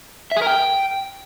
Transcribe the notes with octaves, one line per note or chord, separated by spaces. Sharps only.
E5
G#4
A#4
G5